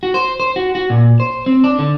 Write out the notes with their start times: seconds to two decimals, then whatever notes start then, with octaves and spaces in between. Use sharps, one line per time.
0.03 F#4
0.14 C5
0.40 C5
0.56 F#4
0.75 F#4
0.90 A#2
1.20 C5
1.46 C4
1.64 D4
1.79 D3